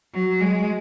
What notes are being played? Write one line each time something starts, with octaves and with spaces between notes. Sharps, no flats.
F#3
G#3